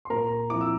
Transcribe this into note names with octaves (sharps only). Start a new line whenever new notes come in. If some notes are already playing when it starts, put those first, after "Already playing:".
C6
A#2 A#4 A#5
F3 C4 E4 D6
E6